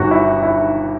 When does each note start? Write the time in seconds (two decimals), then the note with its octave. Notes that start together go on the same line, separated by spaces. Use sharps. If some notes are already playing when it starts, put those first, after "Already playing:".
Already playing: G1 G2 D#3 F#4
0.11 E4
0.43 E4